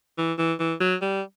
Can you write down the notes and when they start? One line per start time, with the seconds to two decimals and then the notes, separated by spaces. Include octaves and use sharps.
0.18 E3
0.38 E3
0.59 E3
0.80 F#3
1.02 G3